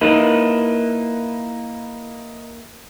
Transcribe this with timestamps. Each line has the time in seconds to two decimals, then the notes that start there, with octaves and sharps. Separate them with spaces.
0.01 A#3 D#4 E4 B4